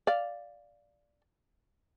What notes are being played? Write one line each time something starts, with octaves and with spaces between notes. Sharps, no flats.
D5 F5